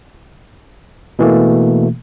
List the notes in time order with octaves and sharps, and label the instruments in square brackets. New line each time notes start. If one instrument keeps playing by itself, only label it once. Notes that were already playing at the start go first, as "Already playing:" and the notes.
[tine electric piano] B2 E3 A3 A#3